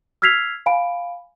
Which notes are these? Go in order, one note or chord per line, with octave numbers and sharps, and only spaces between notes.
E6 F6 G#6 B6 C7 F7
F5 G#5 B5 D7